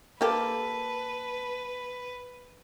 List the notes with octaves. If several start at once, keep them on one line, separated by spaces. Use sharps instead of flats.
A#3 G4 A4 B4